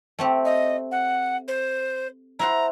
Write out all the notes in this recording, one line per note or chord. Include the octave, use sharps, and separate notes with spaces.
A3 C4 G4
D#5
F#5
C5
E4 C5 F#5 A#5